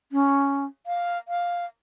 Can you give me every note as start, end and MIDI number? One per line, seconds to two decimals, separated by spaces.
0.12 0.65 61
0.87 1.18 77
1.28 1.66 77